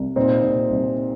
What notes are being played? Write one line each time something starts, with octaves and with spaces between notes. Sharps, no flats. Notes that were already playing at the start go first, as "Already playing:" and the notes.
Already playing: C2
A#2 C4 D#4
A#2
C2